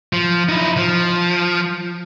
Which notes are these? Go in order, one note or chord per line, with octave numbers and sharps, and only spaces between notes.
F3
D#4 E4
F3